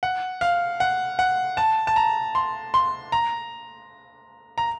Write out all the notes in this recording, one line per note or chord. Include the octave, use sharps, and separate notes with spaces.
F#5
F5
F#5
F#5
A5
A5
A#5
C6
C6
A#5
A#5